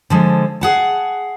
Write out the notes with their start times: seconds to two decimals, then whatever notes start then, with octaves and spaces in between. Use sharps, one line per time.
0.10 D3 F3 G#3
0.61 G#4 F#5 A5